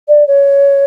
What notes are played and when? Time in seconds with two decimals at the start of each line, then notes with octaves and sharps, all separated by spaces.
0.08 D5
0.28 C#5